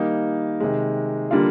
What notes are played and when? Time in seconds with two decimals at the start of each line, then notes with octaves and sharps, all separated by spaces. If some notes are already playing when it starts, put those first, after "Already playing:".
Already playing: D#3 G3 A#3 D#4
0.60 C3 D#3 G#3
1.31 D3 G3 A#3 F4